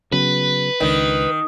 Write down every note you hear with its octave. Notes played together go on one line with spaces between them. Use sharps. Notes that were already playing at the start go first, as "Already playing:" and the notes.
C#3 F#3 B3 B4
C#2 D#3 D4